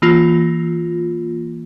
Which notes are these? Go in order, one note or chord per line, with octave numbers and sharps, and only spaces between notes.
E3 A#3 F4